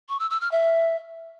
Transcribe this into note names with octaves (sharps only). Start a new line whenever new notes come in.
C#6
E6
E6
F6
E5